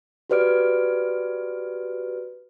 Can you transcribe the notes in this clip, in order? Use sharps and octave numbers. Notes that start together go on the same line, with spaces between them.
F#4 G4 B4 D5 F6 D7